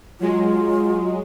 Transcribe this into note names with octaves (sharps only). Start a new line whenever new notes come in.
F#3 G#3 F4